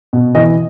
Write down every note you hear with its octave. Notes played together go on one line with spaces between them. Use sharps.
B2
E3 D#5